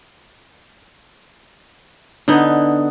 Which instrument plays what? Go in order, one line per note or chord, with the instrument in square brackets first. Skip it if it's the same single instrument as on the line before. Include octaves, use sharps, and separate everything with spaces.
[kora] D3 B3 D#4